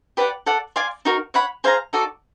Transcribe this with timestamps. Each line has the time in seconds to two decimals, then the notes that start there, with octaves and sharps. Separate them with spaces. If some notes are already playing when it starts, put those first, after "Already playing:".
0.17 G4 B4 D5 F#5
0.46 A4 D5 F#5
0.76 D5 F5 G#5 C6
1.05 D#4 F#4 A#4
1.34 C#5 F#5 B5
1.64 G#4 C5 F5 A#5
1.93 D#4 F#4 A4 D5